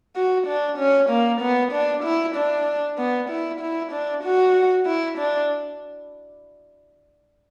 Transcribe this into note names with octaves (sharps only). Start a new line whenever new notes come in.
F#4
D4
C#4
A#3
B3
D4
E4
D4
B3
E4
E4
D4
F#4
E4
D4